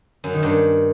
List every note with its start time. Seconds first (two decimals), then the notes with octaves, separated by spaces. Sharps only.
0.24 F#2
0.33 D#3
0.43 G2